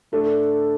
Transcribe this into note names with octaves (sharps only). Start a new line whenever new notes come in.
A2 A3 D4 A4